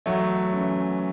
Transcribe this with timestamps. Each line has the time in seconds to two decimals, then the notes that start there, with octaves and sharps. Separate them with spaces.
0.06 E2 F#3 A3
0.53 C#3 E3